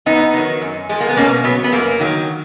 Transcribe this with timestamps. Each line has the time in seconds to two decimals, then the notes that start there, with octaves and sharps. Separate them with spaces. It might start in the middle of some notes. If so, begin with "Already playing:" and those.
0.06 F2 B3 D#4
0.33 D#3 F#3
0.62 F#2
0.89 F3 G#3
1.00 A#3
1.09 B3
1.17 B2 A#3 C#4
1.44 F#3 B3
1.64 B3
1.72 F#2 A#3
2.00 D#3 F#3